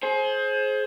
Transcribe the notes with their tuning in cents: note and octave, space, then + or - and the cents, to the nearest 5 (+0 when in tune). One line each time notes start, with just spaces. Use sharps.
G#4 +30 C5 +20